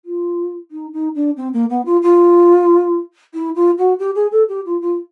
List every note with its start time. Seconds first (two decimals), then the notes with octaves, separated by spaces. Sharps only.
0.05 F4
0.71 D#4
0.93 D#4
1.15 D4
1.37 C4
1.53 A#3
1.70 B3
1.86 F4
2.02 F4
3.34 E4
3.55 F4
3.78 F#4
3.99 G4
4.15 G#4
4.32 A4
4.49 G4
4.66 F4
4.81 F4